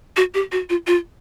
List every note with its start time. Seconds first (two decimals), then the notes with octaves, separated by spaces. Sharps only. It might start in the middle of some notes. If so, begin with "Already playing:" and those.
0.17 F#4
0.34 G4
0.52 F#4
0.70 F4
0.87 F4